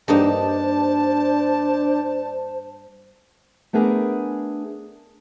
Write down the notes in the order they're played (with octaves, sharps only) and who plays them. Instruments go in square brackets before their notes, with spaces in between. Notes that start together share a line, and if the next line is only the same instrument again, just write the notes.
[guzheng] G2 A#3 D#4 [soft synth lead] D4 [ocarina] C5 [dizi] A5
[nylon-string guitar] A3 B3 D4 G#4 A#4